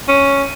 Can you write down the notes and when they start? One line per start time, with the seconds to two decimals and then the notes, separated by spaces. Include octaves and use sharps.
0.08 C#4